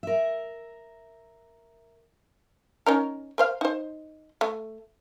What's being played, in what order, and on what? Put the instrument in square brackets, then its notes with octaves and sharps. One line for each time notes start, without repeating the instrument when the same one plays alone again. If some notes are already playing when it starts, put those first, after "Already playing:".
[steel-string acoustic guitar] A#4 E5
[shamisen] C#4 D#4 A#4
A#4 C5 F5
D#4 C5
A3